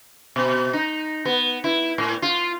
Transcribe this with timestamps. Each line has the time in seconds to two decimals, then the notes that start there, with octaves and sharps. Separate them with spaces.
0.36 B2
0.73 D#4
1.25 B3
1.64 E4
1.98 A2
2.22 F4